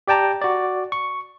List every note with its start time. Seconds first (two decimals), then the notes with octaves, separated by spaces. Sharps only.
0.08 G4 D5 G5 A5 A#5
0.42 F#4 D5
0.92 C#6